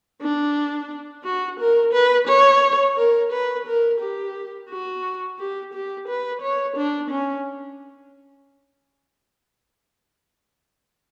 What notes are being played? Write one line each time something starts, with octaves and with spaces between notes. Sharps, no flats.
D4
F#4
A#4
B4
C#5
A#4
B4
A#4
G4
F#4
G4
G4
B4
C#5
D4
C#4